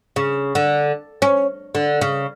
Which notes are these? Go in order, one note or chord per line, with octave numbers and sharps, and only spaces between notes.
C#3
D3
C#4
D3
C#3